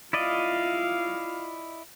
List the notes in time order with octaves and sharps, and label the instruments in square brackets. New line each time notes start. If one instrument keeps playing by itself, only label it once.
[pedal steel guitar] E4 D5 D#5 [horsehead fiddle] F4 F5